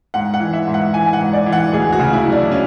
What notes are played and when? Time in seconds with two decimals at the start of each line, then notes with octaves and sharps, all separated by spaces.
0.14 G#2 F#5
0.34 F#5
0.40 E3
0.53 E5
0.67 G#2
0.74 F#5
0.94 E3 G#5
1.13 F#5
1.20 G#2
1.33 D5
1.46 E3
1.52 F#5
1.73 D2 G#4
1.92 F#4
1.99 C#3
2.13 E4
2.26 F#3
2.32 D4
2.52 C#4